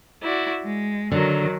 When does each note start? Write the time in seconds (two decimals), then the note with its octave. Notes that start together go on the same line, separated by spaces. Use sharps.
0.22 E4 F#4 D5
0.63 G#3
1.12 D3 D#3 F#3 A#4